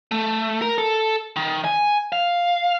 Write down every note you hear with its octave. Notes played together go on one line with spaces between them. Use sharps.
A3
A#4
A4
D#3
G#5
F5